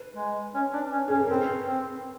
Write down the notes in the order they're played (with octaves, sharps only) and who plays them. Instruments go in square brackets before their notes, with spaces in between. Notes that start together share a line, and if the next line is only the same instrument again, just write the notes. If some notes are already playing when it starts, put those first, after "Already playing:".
Already playing: [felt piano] B4
[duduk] G#3
C#4
D4
C#4
[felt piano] G#4
[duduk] C#4
[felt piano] A4
A#4
[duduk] C4 [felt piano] B4
[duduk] C4